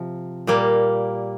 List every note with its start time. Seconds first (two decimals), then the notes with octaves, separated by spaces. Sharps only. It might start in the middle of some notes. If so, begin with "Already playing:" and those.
Already playing: C3 F3
0.47 A#2 G3 A#3